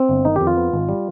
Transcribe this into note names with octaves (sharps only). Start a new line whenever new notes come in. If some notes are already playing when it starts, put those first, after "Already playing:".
Already playing: C4
G1
D#3 D#4
G4
F2
F4
B3
G#1
G3